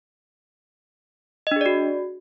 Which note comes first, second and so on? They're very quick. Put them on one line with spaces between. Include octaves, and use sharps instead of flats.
D#5 D4 G#4 D5 F#4